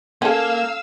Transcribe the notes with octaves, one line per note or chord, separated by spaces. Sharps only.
A#3 C#4 A4 F5 E6